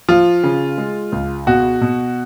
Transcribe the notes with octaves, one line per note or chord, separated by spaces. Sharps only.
F3 F4
C#3
G#3
C#2
B2 F#4
B2